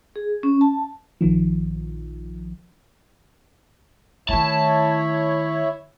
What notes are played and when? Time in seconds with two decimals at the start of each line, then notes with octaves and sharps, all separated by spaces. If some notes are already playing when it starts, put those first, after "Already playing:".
0.16 G#4
0.43 C#4
0.61 A5
1.21 A#1 D#3 F3
4.29 D#3 A3 E4 C#5 E5 A5